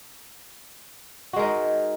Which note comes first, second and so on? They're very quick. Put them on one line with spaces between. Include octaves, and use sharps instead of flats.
F#4 G#3 A#4 D#4